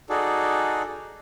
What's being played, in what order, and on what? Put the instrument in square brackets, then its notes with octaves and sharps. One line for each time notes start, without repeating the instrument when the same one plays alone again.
[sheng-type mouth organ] D#4 F#4 G#4 A4 D5